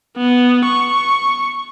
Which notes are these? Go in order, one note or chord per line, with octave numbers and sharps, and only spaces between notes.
B3
C#6